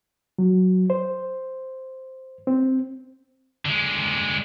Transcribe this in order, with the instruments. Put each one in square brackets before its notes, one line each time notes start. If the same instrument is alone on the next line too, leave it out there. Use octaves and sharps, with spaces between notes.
[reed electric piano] F#3
C5
C4
[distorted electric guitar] D3 G#3